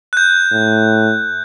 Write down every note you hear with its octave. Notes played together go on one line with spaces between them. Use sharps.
F#6 G6
A2